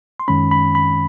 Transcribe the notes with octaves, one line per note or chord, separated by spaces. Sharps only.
C6
F#2 D#3 G#3 C#4 B5
B5
B5